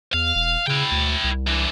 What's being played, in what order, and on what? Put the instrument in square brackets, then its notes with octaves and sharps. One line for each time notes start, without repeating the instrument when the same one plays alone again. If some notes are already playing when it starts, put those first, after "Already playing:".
[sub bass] E2 [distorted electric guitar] F5
[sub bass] E1
[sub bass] C#3 [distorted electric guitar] E4 G5
[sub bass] D2
C2
[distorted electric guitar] D3 E3